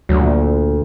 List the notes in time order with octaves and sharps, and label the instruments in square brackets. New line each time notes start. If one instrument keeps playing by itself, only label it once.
[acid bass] D2 [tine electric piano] F#3
[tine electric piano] A#2